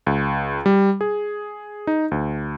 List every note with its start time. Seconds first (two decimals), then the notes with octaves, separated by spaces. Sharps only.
0.06 C#2
0.66 G3
1.01 G#4
1.87 D#4
2.11 D2